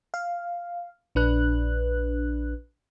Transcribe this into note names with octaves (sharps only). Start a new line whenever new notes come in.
F5
A#1 D4 B4 F#6